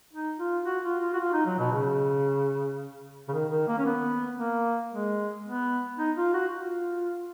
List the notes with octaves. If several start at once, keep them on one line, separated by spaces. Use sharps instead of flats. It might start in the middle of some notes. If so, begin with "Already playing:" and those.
D#4
F4
F#4
F4
F4
F#4
F4
D#4
F#3
B2
C#3
C#3
D#3
D#3
A#3
C#4
B3
A#3
G#3
B3
D#4
F4
F#4
F4